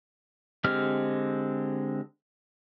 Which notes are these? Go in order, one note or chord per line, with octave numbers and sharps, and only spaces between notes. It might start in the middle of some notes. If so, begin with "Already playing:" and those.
D3 G#3 C4 G4 F6